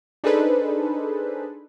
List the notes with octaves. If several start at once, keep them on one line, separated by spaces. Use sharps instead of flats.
D4 D#4 G#4 A4 B4 C5